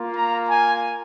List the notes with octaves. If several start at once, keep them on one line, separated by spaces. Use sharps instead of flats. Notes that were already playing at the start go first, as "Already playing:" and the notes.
Already playing: A#3 F4
A#5
G#5